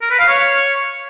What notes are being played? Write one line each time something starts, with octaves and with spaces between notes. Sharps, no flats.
A#4
B4
F5
C#5